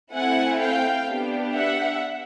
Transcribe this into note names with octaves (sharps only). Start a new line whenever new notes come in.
A3 C4 E4 F#5 G#5
F5 G5
B3 D4 G4
E5 F#5